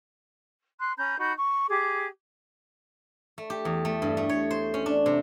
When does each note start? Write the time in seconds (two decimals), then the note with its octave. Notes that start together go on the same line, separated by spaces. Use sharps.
0.80 C6 F#6
0.97 C#4 A#5 B5 G6
1.19 D#4 F#4 B5 G6
1.37 C#6
1.68 G4 G#4 D6
3.38 A3
3.50 G4
3.65 E2
3.85 A3
4.02 G2
4.17 A3
4.29 C#5
4.51 C5
4.74 C#4
4.86 D4
5.06 C3